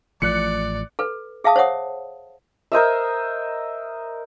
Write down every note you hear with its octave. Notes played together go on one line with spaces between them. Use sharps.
A1 A2 F3 D5 F#6 C#7
A4 B4
G#4 E5 F5 A5 D#6
C5 C#5 E5 F#5 D#6
A#4 C5 D#5 E5